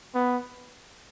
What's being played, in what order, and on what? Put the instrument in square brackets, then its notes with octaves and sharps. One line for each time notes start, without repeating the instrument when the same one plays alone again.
[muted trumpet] B3